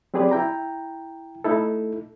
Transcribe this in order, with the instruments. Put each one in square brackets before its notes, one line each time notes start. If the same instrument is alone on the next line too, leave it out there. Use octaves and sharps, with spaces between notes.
[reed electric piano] F#3 C4 G4 G#4 B4 D5
E4 G5 A#5
A3 D#4 E4 A4